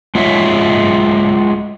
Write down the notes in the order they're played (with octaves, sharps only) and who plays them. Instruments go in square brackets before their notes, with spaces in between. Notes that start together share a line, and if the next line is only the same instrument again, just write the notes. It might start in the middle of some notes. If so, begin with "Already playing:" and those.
[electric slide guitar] G#3 F4 F#4 C#5 E5